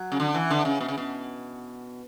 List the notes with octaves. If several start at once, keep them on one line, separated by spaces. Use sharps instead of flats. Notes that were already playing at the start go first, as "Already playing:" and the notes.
Already playing: F#3
C#3
D3
E3
D3
C#3
B2
C#3
B2